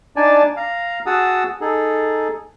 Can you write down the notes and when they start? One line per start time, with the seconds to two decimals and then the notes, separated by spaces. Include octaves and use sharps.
0.16 D4 D#4 D5 G#5 A5
0.57 F5 A#5
1.06 F#4 G#4 F#5 A5 D#6 E6
1.61 D#4 G#4 A4